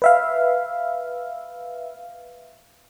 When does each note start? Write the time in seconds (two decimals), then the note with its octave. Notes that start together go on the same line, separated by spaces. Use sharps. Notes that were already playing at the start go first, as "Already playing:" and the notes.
0.02 B4 E5 F5